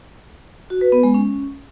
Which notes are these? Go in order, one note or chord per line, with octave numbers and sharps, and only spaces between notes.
F#4
B4
B3
G#3
C#4